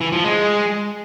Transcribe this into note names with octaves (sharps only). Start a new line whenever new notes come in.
E3
F3
G#3